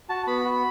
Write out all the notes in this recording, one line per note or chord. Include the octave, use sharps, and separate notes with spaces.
F#4 A5
B3 B5
F#4